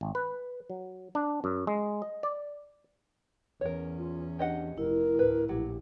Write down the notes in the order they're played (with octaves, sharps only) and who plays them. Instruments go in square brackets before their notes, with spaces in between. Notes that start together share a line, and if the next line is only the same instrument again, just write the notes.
[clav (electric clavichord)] G#1
B4
F#3
D4
F#2
G#3
D#5
D5
[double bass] E2 C#4 [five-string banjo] A#4 C#5
[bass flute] F4
[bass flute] D4 [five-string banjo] G4 D#5 F#5
[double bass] F1 [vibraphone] E4 [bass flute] A#4
[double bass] D2 A2 [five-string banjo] B4
[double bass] A#1 [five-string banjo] F#3 [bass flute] G4